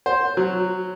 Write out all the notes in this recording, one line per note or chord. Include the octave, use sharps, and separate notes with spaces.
C5
F#3